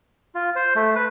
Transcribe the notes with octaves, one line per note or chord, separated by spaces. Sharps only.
F4
C5
A3
B4